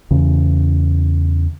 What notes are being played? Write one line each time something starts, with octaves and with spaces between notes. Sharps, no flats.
E2 C#3